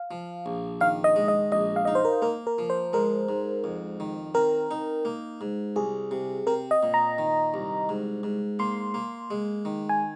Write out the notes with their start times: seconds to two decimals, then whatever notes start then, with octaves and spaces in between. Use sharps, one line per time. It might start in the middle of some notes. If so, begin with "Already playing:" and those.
Already playing: F5
0.11 F3
0.46 A#1
0.81 D#3 F5
1.04 D#5
1.16 G#3
1.28 D#5
1.52 A#1 D#5
1.76 F5
1.85 D#4 D#5
1.95 C5
2.05 A#4
2.22 A#3 A#4
2.47 A#4
2.58 F3
2.70 C5
2.93 G#3 A#4
3.29 G#2
3.64 F2
4.00 D#3
4.35 C4 A#4
4.71 D#4
5.05 A#3
5.41 G#2
5.76 C2 G#4
6.11 C3
6.47 C4 A#4
6.71 D#5
6.83 A#2
6.94 A#5
7.18 D#3
7.54 C2
7.89 G#2
8.23 G#2
8.59 A#3 C6
8.94 A#3
9.30 G#3
9.65 D#3
9.89 G#5